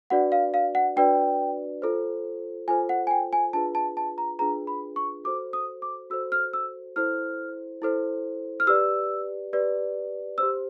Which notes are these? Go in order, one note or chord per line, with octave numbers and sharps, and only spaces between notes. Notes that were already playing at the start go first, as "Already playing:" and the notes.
D4 F#4 B4 D5 F#5
F5
F5
F#5
D4 F#4 B4 D5 G5
F4 A4 C5
F4 A4 C5 G#5
F#5
G#5
G5
G#5
D4 F4 G#4 B4 A5
A5
A5
A#5
D4 F4 G#4 B4 A#5
B5
C#6
F#4 A4 C5 D6
D#6
D6
F#4 A4 C5 E6
F6
E6
E4 A4 C5 F6
E4 A4 C5
F6
G4 B4 D5 E6
G4 B4 D5
G4 C5 E6